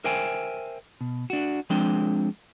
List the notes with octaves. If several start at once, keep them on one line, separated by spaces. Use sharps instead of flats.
A#4 C5 E5 G5 G#5
B2
D4 F#4
F3 G#3 C4 D4 G5